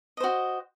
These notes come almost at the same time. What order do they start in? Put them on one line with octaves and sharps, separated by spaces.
D#5 C5 F#4